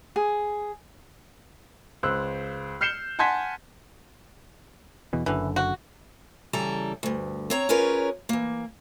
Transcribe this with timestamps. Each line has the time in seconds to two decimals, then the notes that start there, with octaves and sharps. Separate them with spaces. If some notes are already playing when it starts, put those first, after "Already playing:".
0.16 G#4
2.03 C#2 C5 E6 F#6
2.81 F6 G6 C7 C#7 E7 G7
3.19 F#5 G#5 A5 C6 G#6 B6
5.13 E2 B2 E3
5.26 F#1 F#2 D3 E3
5.56 F#4
6.53 C#3 E3 G3 A4 A#5
7.03 D2 G2
7.50 C4 C#5 A#5
7.69 C#4 F4 G#4 A#4 B4 C#5
8.29 E3 A#3